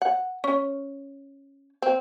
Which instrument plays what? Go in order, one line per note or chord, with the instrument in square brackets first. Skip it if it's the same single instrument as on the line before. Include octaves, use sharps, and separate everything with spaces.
[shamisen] F#5
C#4
C4